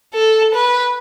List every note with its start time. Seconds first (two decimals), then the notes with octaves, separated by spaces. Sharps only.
0.15 A4
0.54 B4